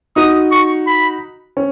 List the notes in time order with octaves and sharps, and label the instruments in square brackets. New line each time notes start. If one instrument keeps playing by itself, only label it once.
[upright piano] D#4 F#4 [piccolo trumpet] D#6
[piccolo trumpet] C#6
B5
[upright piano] C#4